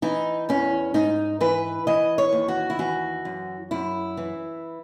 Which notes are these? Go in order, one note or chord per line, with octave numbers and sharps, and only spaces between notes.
E3 D#4
E2 C#4
G#2 D#4
E3 B4
E3 D#5
C#5
D#2
F#4
E4
E3 F#4
F#2
F#2 E4
E3